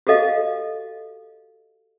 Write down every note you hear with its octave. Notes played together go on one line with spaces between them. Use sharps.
F#4 G4 A4 D#5 F5